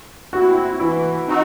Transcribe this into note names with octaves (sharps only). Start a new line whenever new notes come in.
C4 E4 F#4
E3 E4
C4 D#4 F#4